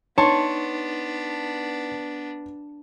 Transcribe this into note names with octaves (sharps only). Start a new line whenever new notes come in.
B3 D4 D#4 C#5 A5 C6